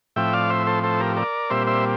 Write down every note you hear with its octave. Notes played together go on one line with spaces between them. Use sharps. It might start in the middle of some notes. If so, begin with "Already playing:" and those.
A2 F3 C4 E5 G5
D5 F5
C5 E5
A4 C5
A4 C5
G4 A#4
A#4 D5
A#2 G3 C4 C5 E5
C5 E5